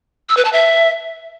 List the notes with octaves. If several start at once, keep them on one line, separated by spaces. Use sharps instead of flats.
E6
B4
A5
E5